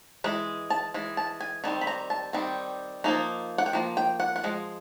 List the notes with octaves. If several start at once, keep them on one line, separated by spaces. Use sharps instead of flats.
E3 G#3
A5
E3 G#3
A5
G#5
D#3 G3 C4 A5
B5
A#5
A5
D#3 G3 C4
F3 A#3 D#4
F#5
G5
F3 A#3
G5
F#5
F#5
F3 G#3